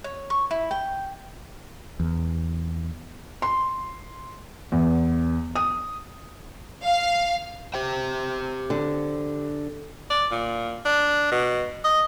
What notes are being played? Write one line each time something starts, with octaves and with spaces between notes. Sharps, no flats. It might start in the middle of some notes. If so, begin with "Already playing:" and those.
C#5
C#6
E4
G5
E2
C6
E2
D#6
F5
G4 C5 G5
D3
D5
A#2
D4
B2
D#5